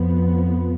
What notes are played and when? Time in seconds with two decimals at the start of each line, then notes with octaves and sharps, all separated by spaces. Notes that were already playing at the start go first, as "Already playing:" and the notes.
Already playing: F2 F3 B3